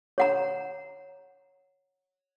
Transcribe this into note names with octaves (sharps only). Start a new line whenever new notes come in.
C#5 F#5 A#5